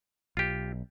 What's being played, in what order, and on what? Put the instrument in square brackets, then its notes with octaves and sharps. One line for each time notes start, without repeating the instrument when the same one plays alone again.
[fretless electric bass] B1 [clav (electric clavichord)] F4 G4